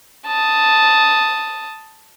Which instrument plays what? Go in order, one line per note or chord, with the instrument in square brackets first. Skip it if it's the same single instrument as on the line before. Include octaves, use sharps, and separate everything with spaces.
[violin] A5 D#6